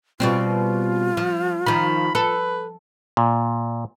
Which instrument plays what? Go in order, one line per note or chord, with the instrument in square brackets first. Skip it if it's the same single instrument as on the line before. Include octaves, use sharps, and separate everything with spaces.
[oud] B2 G3 C4 [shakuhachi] F4
[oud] F3
[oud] D#3 F3 [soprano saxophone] B5
[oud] A4 [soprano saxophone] B4
[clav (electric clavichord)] A#2